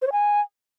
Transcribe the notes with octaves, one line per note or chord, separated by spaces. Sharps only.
C5
C#5
G#5